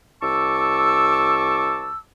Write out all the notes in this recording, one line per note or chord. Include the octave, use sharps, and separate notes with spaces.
C2 A5 C#6 D6 E6